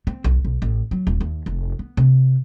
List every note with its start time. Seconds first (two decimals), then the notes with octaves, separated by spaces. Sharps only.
0.07 C4
0.24 B1
0.45 B1
0.62 A1
0.91 F#3
1.07 D#1
1.21 D#2
1.46 F1
1.79 B3
1.97 C3